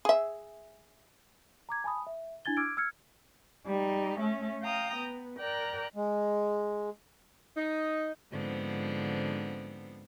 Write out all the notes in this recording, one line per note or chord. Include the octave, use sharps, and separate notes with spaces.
G#4 E5
A#5 D6 G#6
G#5 A5 B5 D#6
E5
D4 E4 G#5 G#6 A6 G7
D6 E6 F6 G#6 D7
E6 F6 G#6 C#7
G3 D#4
A3 C#4
F5 G5 A#5 D#6
B3
A#4 D5 G5 A#5 F#6
G#3
D#4
G#2 D3 F3 B3 C4